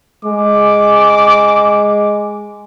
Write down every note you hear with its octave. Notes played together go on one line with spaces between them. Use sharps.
G#3 D6